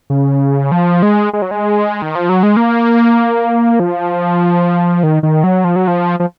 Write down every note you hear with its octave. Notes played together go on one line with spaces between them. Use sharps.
C#3
F3
G#3
G#3
F#3
G#3
D#3
F3
F#3
G#3
A#3
F3
D#3
D#3
F#3
F3
F#3
F3
F3